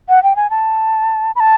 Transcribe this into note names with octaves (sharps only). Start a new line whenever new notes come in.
F#5
G5
G#5
A5
B5
A5